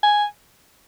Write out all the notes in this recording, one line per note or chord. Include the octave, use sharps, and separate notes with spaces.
G#5